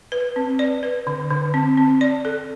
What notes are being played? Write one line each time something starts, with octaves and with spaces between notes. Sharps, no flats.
B4
C4
D5
B4
D3
D3
C4
C4
D5
A4